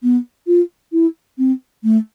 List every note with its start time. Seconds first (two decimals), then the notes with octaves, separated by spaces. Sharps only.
0.03 B3
0.47 F4
0.92 E4
1.38 C4
1.84 A3